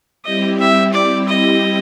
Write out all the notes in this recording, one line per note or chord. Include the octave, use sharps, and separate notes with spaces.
G3 C4 E4 G4 D#5
E5
D5
D#5